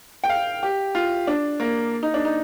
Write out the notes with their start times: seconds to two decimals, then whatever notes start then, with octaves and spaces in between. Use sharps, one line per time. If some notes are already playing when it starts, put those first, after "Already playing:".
0.24 G5
0.29 F5
0.63 G4
0.95 F4
1.27 D4
1.60 A#3
2.03 D#4
2.14 D4
2.25 D#4